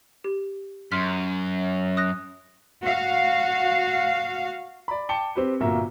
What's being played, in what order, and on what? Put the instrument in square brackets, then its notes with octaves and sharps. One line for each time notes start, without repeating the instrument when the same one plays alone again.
[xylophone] G4
[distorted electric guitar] F#2 [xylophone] C6 F6 B6
[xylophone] D#6 F#6 A#6
[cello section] F#4 F5
[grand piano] D5 B5
G5 A5 D6 C#7 G7
C4 G4 B4
G1 A#2 A#3 F#4 E5 A#5